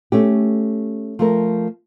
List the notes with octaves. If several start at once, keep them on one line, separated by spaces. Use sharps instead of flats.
A3 C#4 G4
F3 A3 A#4